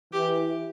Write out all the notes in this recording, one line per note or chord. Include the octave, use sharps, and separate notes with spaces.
E3 G4